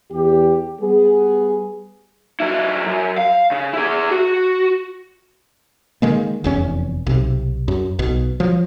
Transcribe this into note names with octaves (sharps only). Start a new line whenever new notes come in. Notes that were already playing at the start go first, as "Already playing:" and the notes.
E2 G4
G3 B3 G#4
F#3 E4
F#2
F5
C#3
E4 G#4
F#4
D3 D#3 G#3 A#3
F1 E2 C#4
B1 C3
F#2
B1 B2
F3 F#3